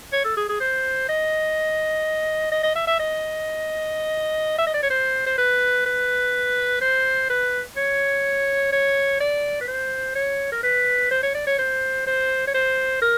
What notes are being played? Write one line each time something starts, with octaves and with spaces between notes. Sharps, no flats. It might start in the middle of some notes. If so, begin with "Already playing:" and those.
C#5
A4
G#4
G#4
C5
D#5
D#5
D#5
E5
E5
D#5
E5
D#5
D5
C#5
C5
C5
B4
B4
C5
B4
C#5
C#5
D5
B4
C5
C#5
A#4
B4
C5
C#5
D5
C#5
C5
C5
C#5
C5
A#4